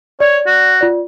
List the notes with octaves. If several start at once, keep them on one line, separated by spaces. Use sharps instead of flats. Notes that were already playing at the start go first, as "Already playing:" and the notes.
C#5 D5
F#4
F4 D5